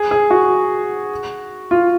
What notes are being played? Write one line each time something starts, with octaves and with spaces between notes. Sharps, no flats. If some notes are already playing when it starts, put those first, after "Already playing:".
Already playing: G#4
G#4
F#4
F4